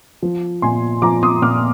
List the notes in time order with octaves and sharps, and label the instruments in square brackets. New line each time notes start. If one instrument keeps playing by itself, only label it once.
[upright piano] F3
A#2 G#5 C6
F3 A#5 D6
C6 D#6
A#2 D6 F6